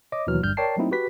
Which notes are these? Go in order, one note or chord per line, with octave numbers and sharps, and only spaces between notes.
C#5 D#5 D6
D#2 B2 E3 F#3 F6
G1 G2 G3 F6 G6
A#4 C#5 D5 G5 A5 C7
F#3 A3 A#3 C4 D#4 E4
F#4 G4 B4 B6